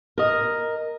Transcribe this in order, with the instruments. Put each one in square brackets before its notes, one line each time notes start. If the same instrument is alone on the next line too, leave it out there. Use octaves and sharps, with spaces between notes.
[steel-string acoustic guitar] A#4 D#5